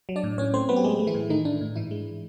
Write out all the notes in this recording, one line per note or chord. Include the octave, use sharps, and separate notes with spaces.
F#3
D4 D5
A2
A2 C#4 C#5
A3 C4 C5
F#3 B3 B4
G4
G#3 A3 G#4
A3
E3 E4
A2
D#3 A3 D#4
A2 D4
A2
G#2 E3 E4
G#3